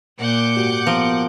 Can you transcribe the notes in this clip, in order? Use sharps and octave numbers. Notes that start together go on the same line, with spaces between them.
A#2 F#5 D6 G6
G#2 F#4 G4
F3 B3 A#4